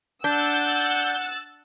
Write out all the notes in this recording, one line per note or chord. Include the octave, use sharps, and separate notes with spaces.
D4 F#5 E6 F#6 G6 A6